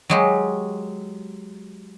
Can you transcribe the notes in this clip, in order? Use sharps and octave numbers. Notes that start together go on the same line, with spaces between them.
F#3 G#3 G4